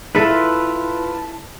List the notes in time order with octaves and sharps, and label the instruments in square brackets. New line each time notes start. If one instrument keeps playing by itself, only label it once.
[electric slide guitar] E4 [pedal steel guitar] F4 B4 [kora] A4 E5 [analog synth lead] A5